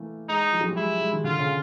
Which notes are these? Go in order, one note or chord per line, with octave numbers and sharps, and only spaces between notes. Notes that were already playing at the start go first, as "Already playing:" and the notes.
Already playing: E3 A3 A#3
G#3 D#4
F3
F#3
G3
G#3 E4
G#3
D#3
D3 F4
C#3